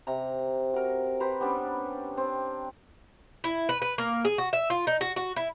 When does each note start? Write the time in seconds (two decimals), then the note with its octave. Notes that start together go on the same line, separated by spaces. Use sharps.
0.07 C3 A#5
0.74 F#4 A#4
1.20 G4 B4 C5 A#5
1.40 G3 B3 C#4 D4
2.17 C4
3.44 E4
3.69 B4
3.82 B4
3.98 A#3
4.25 G#4
4.38 F#4
4.53 E5
4.70 F4
4.87 D#4
5.01 F#4
5.16 F#4
5.36 E4